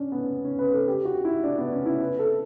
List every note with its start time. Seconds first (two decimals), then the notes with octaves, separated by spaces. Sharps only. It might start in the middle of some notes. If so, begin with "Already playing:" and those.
Already playing: C#4 D4
0.12 B3
0.45 C#4
0.59 B4
0.73 A4
0.87 G4
1.05 F#4
1.25 E4
1.44 D4
1.58 B3
1.72 C#4
1.86 E4
2.00 B4
2.19 A4